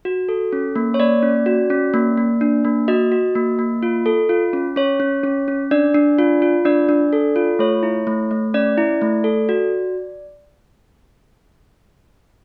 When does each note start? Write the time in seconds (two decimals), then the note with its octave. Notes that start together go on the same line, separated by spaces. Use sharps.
0.05 F#4
0.29 A4
0.53 C#4
0.76 A#3
0.94 C#5
1.00 A#3 D5
1.23 C#4
1.46 F#4
1.70 C#4
1.94 A#3
2.17 A#3
2.41 D4
2.65 A#3
2.88 F#4 D#5
3.12 F#4
3.35 A#3
3.59 A#3
3.83 F4
4.06 A4
4.29 F4
4.53 C#4
4.76 C#4 C#5
5.00 C#4
5.24 C#4
5.48 C#4
5.71 D4 D5
5.94 D4
6.19 F4
6.42 F4
6.65 D4 D5
6.89 D4
7.13 A4
7.36 F4
7.59 A3 C#5
7.83 E4
8.07 A3
8.31 A3
8.54 C#4 D5
8.78 E4
9.02 A3
9.24 A4
9.49 F#4